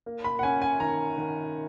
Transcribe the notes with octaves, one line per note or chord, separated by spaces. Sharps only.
A#3
B5
F#5
C#4 G#5
G#5
D#3 A#5
D#3